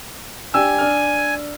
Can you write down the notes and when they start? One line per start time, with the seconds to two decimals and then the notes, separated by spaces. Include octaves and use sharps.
0.54 D4 G4 G#5 E6
0.78 D4 F6